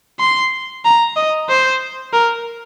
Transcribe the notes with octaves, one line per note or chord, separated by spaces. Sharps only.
C6
A#5
D#5
C5
A#4